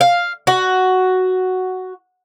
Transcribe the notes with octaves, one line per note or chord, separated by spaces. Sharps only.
F5
F#4